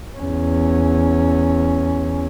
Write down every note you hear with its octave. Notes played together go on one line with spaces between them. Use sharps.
E2 C#4